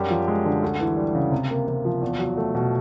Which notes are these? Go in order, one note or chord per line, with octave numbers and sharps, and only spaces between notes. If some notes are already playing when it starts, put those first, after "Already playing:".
Already playing: F#2 G3 G4
F3
G#3
D3
D2
E3
G3
C#3
C3
A#3
C3
F3
E2
F#3
A3
B2